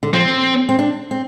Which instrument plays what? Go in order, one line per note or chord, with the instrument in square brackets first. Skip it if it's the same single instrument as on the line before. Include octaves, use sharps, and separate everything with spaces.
[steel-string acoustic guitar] D3
[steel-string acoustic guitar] F3 [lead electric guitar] C4
[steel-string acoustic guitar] C4
D4
C4